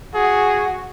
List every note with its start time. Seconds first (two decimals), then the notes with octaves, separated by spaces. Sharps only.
0.15 F#4 G#4